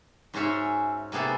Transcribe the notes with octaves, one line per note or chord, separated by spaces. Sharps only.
G#2 C#4 F#4 G#4 C#5 E5
C3 A#3 B3 G#4 A4